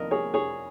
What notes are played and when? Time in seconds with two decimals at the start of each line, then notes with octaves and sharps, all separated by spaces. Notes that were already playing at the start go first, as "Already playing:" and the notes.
Already playing: F2 D#3 A#4 D#5
0.11 G#4 C#5
0.34 G#4 C#5